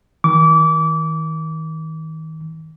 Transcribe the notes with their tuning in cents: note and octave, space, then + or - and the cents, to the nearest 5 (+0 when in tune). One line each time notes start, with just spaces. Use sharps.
D#3 +35 D6 -30